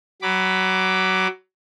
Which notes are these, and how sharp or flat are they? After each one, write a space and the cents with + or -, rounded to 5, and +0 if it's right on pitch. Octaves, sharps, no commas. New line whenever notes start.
F#3 +20 B5 +0 D6 +0